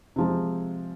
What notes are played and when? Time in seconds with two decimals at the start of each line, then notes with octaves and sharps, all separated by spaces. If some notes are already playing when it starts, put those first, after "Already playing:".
0.16 C3 F3 G#3